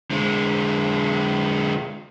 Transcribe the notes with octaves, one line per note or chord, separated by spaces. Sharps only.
D3 G#3